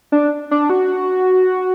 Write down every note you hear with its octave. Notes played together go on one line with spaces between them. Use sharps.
D4
D4
F#4